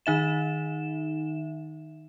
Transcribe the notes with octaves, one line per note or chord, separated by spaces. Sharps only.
D#3 D#4 E5 E7